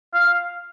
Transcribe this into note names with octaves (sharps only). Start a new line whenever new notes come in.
F5